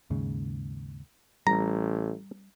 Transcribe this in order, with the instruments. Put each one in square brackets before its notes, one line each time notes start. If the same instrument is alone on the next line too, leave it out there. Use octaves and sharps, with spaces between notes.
[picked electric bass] D#2 G#2 C#3
[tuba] A1 [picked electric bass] G3 [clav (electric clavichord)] A#5